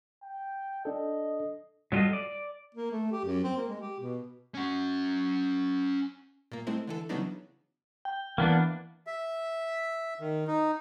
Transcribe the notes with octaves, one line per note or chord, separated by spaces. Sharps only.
G5
D4 A4 D#5
F#3 G3 F4 F#4 A4 D#5
D5
A#3
A3
G4
F#2
C4
A#3
G#3
G4
B2
C#4 F#4
A#2 A#3
G#3 A3 C4 E4
D3 E3 A4
C#3 E3 F#3 B3 D4 D#4
G5
E3 A#3 B3 D4
E5
D#3
D#4